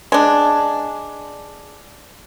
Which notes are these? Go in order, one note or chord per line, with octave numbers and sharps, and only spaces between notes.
G#3 D4